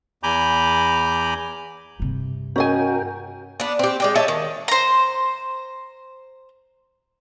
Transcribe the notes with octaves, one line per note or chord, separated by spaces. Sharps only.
E2 G#5 A#5 B5 D6 G6
G2 C3
C#4 F#4 A#4 D#5 G5 G#5
B3 D4
C4 G4
G#3 D5 G5
C#5 D#5 E5 A5
D#3
C5 A#5